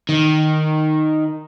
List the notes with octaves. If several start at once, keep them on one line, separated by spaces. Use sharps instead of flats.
D#3